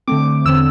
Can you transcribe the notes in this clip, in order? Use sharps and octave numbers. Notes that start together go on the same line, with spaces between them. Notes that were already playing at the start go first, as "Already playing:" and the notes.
D3 A3 C4 D6
E2 D3 C4 E6